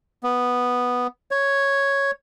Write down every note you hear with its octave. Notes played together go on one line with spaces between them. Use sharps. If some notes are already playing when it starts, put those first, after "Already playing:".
B3
C#5